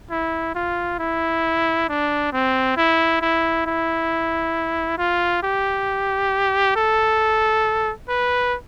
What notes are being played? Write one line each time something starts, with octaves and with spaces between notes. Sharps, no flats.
E4
F4
E4
D4
C4
E4
E4
E4
F4
G4
A4
B4